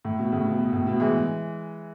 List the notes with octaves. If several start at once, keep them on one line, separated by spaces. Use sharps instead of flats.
A2
B2
A2 C#3
B2
B2
A2
B2
E3 G#3